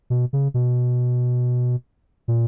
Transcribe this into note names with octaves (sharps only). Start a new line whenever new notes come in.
B2
C#3
B2
A#2